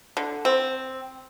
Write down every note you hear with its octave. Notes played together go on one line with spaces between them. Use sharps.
D3
C4